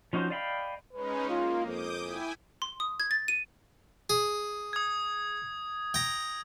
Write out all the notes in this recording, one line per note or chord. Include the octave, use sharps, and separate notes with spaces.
F3 C#4 D#4 F#4 C5
D5 D#5 F5 G5 B5
G#3 C#4 D#4 B4
A#3 F4
F2 D6 D#6 G6
E4 G5 G#5
C6
D#6
G#6
A6
D#7
G#4
D#6 G#6
G5 A#5